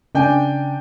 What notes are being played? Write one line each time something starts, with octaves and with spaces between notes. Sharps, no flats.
C#3 D4 G5 G#5